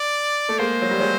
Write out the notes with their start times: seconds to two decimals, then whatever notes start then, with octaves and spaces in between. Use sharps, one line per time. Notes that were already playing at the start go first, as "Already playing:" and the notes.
Already playing: D5
0.49 A3
0.59 G#3 A#3 C5
0.82 F#3
0.91 G3
1.01 F#3 G#3